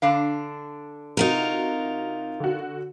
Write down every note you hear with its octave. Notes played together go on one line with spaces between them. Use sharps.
D3 D4 F5
C3 D#4 F4 F#4 A#4
D3 F#4